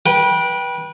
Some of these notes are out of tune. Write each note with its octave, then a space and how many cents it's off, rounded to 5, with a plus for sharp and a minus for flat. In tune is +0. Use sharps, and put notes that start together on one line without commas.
B4 -25 G5 +0